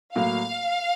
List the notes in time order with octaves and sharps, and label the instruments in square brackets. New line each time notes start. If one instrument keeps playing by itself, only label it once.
[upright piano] A2 F#3 A#3 [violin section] F5